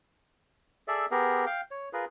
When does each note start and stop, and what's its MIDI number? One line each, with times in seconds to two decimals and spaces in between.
0.88 1.06 68
0.88 1.06 69
0.88 1.06 74
0.88 1.06 76
1.11 1.45 59
1.11 1.45 67
1.11 1.45 68
1.11 1.45 70
1.46 1.61 77
1.46 1.61 79
1.71 1.89 73
1.93 2.05 65
1.93 2.05 68
1.93 2.05 70
1.93 2.05 71